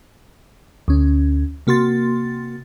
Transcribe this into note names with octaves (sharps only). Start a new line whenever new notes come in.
D2 C#4
C3 A#3 F#4 C6 A6